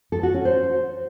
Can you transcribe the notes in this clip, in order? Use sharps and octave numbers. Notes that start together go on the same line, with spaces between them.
A4
F#4
C#4
C5